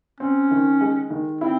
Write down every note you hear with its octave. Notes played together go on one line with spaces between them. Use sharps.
C4 C#4
D#3
G#3
D#3
C4 E4